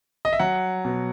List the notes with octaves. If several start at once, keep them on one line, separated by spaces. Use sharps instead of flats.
D#5
E5
F#3 F#5
B2